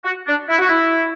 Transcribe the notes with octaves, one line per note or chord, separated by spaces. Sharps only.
F#4
D4
E4
F#4
E4